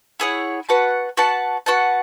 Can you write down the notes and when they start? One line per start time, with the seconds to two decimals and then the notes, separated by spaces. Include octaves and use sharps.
0.20 E4 G#4 C#5 F#5
0.69 F#4 B4 F#5 A5
1.17 F#4 B4 F#5 A5
1.66 F#4 B4 F#5 A5